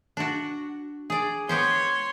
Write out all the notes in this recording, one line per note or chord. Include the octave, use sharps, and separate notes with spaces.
D4 F#4
G#4 D5
B3 G4 C5 C#5 C6